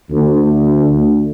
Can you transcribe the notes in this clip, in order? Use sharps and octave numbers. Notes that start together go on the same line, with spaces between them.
D2